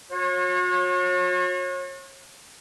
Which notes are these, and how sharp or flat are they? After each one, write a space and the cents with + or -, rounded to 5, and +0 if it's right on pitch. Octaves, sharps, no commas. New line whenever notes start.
F#4 -45 C#5 -35